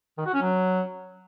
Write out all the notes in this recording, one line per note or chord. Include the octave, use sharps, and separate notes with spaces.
D#3
F#4
C#4
F#3